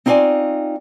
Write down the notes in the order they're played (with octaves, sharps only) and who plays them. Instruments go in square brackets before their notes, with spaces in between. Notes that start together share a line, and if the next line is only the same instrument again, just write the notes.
[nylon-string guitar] C4 D#4 F4 B4 D5 G#5